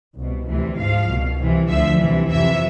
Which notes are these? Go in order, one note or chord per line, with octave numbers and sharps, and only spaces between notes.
C2 B2
D2 C3 E3
G#2 F3 F5
C2 B2
C2 C3 E3
D2 D3 F3 E5
C2 C3 E3
F2 C3 E3 E5